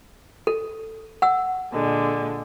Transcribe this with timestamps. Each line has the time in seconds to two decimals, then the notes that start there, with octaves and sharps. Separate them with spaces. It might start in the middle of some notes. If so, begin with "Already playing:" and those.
0.47 A4
1.22 F#5 E6
1.73 A#2 D3 G#3